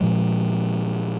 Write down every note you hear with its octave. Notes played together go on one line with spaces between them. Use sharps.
A#2 F3 G#3